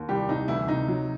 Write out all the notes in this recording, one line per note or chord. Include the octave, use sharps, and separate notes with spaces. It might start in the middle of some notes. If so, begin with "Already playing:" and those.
Already playing: D#2
C2 G3 G4
C2 D#4
D2 E3 E4
C3 D#4
F#3